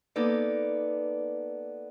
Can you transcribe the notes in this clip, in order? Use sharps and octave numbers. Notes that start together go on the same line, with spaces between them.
A#3 B3 D#4 A4 D5